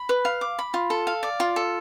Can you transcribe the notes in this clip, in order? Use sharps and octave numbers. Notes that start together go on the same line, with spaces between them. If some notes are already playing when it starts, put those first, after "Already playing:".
Already playing: B5
B4
F5
D6
B5
F4
A4
F5
D5
F4
A4